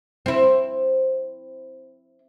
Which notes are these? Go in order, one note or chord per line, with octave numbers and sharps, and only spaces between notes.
C4 E4